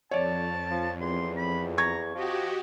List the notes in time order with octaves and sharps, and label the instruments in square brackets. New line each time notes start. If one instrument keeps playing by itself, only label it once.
[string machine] F2 [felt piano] C#5 D5 [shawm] A5
[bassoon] F3
[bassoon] E2 [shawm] C6
[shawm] B5
[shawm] A#5 [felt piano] C#6 G#6
[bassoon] F3 [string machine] F#4 G4 [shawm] D#5